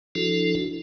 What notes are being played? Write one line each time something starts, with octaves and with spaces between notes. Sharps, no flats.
F3 D4 E4 F#4 A4